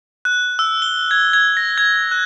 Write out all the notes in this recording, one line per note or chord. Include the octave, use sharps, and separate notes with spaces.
F#6
E6
G7
G#6
G#6
A#6
G#6
F#6